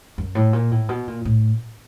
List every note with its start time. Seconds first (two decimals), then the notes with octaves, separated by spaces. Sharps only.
0.18 F#2
0.35 A2
0.53 A#2
0.71 A2
0.89 B2
1.07 A#2
1.25 A2